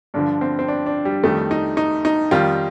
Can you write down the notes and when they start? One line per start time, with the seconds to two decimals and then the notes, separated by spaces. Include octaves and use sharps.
0.14 G2 D3 F3 D4
0.41 C4
0.59 C4
0.68 D4
0.86 D4
1.05 G3
1.24 F2 D#3 G3 A3
1.51 D#4
1.77 D#4
2.05 D#4
2.31 F2 D#3 G3 F4